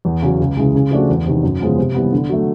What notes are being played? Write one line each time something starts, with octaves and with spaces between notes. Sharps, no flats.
E2
C#3 F#3
C#2
C#3 E3 G#3
C#3
F3 A3 D4 F#4
E2
C3 D#3
F#2
C#3 F3 G#3 B3
C3
E3 G3 B3
D3
F#3 A3